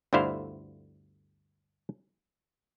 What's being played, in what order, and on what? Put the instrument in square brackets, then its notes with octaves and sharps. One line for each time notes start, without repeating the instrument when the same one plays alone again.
[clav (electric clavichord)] G1 D2 D3 E4 C5 F5